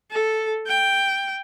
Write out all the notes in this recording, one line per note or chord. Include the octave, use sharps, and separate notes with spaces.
A4
G5